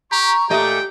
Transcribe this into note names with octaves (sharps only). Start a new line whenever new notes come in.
G4 A#5 C#6
A#2 A3 G4 D#5 G5